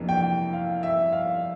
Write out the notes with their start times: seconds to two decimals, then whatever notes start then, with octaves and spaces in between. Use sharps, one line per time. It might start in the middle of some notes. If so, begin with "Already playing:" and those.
Already playing: F2 C3 E3 A#3 D4
0.09 G5
0.53 F5
0.83 E5
1.13 F5